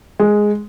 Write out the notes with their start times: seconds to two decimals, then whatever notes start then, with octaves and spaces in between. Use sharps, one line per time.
0.20 G#3